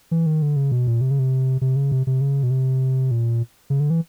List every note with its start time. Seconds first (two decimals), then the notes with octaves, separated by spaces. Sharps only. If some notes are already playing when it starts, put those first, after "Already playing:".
0.11 E3
0.26 D#3
0.42 D3
0.56 C#3
0.72 B2
0.87 A#2
1.01 C3
1.11 C#3
1.19 C3
1.61 C3
1.76 C#3
1.92 C3
2.07 C3
2.21 C#3
2.43 B2
2.51 C3
3.11 A#2
3.70 C#3
3.80 D3
3.90 E3